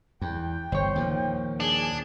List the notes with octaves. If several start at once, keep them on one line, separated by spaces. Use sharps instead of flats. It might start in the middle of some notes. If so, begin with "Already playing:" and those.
E2 G5
G1 C5 C#5
D#2 A#2 F3
D4 G#4